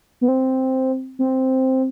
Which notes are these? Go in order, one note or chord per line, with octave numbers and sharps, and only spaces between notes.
B3
C4
C4